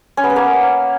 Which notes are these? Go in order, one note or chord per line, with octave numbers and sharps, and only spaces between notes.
C#4
B3
B4
A#3